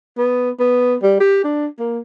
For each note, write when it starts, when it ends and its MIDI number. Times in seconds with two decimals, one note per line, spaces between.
0.18 0.50 59
0.60 0.95 59
1.03 1.16 55
1.20 1.40 67
1.44 1.67 62
1.80 1.99 58